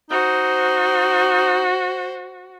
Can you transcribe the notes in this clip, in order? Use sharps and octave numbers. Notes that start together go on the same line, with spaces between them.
D#4 F#4 C5